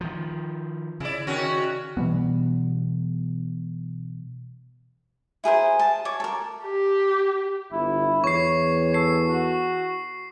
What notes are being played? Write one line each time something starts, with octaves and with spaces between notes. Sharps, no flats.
D#3 F3
C#3 E4 D5
D#3 C#4 F#4
B2 E3 G3 B3
E4 G#4 A#4 C5
A5
C#5 D6
A4 A#4
G4
G1 E4
E2 C#5 C#6 C7
A4 C7
F#4